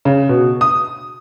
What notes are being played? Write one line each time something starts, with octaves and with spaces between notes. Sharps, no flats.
C#3
B2
D#6